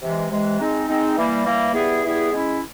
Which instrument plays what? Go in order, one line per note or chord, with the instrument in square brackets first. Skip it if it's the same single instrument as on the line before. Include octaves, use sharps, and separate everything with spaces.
[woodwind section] C3 E3 G#3
C3 E3 G#3
G#3 C4 D#4
G#3 C4 D#4
E3 G3 A#3
E3 G3 A#3
E3 G3 B3 E4 G#4
E3 G3 B3 E4 G#4
G#3 C#4 E4